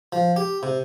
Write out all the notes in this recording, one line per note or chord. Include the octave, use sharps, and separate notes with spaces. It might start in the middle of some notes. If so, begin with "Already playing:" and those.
F3
G4
C3